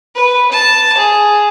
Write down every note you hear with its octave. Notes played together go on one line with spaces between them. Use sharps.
B4
A5
G#4